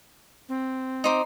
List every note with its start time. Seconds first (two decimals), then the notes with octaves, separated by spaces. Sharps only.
0.49 C4
1.04 D#4 C5 D6